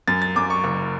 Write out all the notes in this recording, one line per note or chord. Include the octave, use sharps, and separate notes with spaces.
F#2 A6
A6
F#2 D6
C#6
F#1